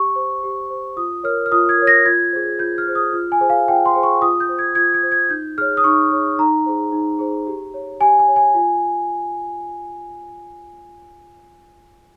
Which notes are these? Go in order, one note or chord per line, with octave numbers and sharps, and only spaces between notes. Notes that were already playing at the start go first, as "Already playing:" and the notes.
Already playing: G4 C#6
C5
G4
C5
F4 D#6
A#4 C#5 F6
F6
F4 D#6
G#6
A#4 C#5
A#6
F4 G#6
G#4 C5
F4 G6
F6
G#4 C5
D#6
F4 F6
G#5
G#4 C5
F5
F4 G5
C6
G#4 C5
C#6
F4 D#6
G6
C5
G#6
F4 G#6
G#6
C5
G#6
D#4 G6
G#4 C#5 F6
D#6
D#4 C#6
G#4 C#5
D#4 A#5
G#4 C5
D#4
G#4 C5
G4
C#5
G4 G#5
G#5
C#5
G#5
F4